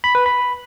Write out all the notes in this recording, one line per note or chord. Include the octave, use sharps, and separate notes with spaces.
B5
B4
B5